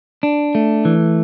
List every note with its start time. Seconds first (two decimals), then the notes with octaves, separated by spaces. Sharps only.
0.23 D4
0.55 A3
0.85 E3